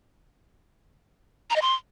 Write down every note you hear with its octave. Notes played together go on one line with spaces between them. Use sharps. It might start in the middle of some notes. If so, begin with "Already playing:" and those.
A#5
D#5
C6